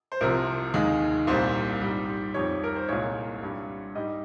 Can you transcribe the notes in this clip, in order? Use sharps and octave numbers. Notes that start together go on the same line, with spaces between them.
C5
C2 C3 F3 A#4
D#2 D#3 G#3
C2 A#2 G3 C5
G#2 G3
F2 D#3 G3 C#5
A#4
C5
C2 A#2 G#3 C#5
G2 G3
G#2 G3 D#5